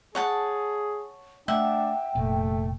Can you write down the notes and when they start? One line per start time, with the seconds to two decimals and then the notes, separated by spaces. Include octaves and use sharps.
0.15 G#4 C#5 F#5 A5
1.48 A3 D4 E5 F#5 G5
2.15 F1 A#2 A3